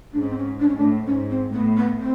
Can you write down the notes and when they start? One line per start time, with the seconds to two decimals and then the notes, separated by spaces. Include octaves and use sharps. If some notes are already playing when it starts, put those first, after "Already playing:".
0.12 G#2 D4
0.21 C#4
0.30 C4
0.37 C#4
0.60 D4
0.68 C#4
0.76 A2 D4
1.06 G#2 C#4
1.29 C4
1.53 A2 B3
1.76 B3
2.00 C4